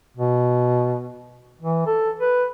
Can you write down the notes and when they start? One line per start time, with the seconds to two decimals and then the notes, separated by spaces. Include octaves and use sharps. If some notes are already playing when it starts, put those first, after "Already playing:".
0.17 B2
1.61 E3
1.86 A4
2.20 B4